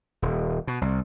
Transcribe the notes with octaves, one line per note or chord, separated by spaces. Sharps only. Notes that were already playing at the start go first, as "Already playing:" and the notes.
D#1
B2
C2